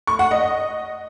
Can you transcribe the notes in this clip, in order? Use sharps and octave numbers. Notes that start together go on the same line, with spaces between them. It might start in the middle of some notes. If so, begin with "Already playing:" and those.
C#6
F#5
D#5